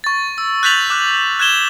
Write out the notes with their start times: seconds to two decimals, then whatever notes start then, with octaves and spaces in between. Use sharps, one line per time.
0.04 C#6 A6
0.38 E6
0.63 F#6 G6 A6 B6 F7 F#7
0.90 D6 F#6
1.39 F#6 G#6 E7 G7